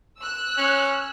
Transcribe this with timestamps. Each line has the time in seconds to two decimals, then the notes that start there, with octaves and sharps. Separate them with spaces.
0.18 E6 F#6
0.57 C#4